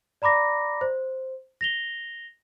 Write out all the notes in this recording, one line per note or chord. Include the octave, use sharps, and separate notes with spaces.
D5 A#5 B5 D6 A#6
C5
A#6 F7 G7